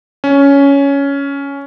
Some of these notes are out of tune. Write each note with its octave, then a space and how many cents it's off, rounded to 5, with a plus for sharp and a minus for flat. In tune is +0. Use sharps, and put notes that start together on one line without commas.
C#4 +10